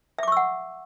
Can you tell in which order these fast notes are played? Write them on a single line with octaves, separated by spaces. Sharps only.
E5 D6 C#6 E6 F#5